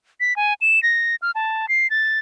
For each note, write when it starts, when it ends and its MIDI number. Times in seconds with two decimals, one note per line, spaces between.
0.20 0.36 95
0.36 0.54 80
0.61 0.82 100
0.83 1.16 94
1.22 1.31 89
1.35 1.69 81
1.69 1.90 96
1.90 2.19 93